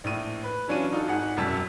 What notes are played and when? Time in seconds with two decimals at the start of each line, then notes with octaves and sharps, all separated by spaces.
0.04 A#1 A2 D#7
0.44 B4
0.68 E3 F#3 C#4 D4 F4 D#7
0.93 D#4 F4 F#4 A4
1.08 G#1 D#4 G#4 F#5
1.37 E1 C2 F#2 A5 E6 B6